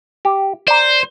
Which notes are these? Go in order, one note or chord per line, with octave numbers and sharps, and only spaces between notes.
G4
C5 D5 A#5